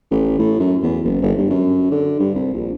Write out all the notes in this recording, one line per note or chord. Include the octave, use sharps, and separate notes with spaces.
A1
A2
F#2
E2
F#1
G1
G2
F#2
D3
G2
C2
A#1